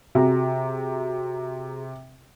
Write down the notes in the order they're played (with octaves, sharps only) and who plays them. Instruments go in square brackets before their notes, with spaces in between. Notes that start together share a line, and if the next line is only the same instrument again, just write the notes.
[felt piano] C3 [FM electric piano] F#4 G#4 A#5